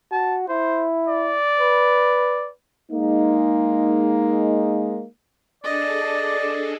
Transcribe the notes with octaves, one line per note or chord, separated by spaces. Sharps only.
F#4 A5
E4 C5
D5
B4
G#3 A#3 D#4
D4 G#4 A4 D5 D#5